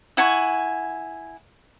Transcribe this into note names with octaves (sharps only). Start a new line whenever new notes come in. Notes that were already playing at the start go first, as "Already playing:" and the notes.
E4 F#5 G#5 C#6